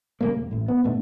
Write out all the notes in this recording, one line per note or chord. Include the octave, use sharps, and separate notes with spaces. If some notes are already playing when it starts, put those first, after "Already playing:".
C#3 G3 A3 A#3
E1
A1 A2
B3
G#2 B2 A3 D4